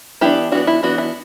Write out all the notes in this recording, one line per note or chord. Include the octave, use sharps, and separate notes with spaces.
E3 B3 D4 E4 G4
E3 B3 D4 F#4
E4
E3 B3 D4 F#4
E4